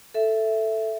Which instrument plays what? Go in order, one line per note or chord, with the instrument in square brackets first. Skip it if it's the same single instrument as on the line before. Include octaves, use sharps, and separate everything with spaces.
[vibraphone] A4 E5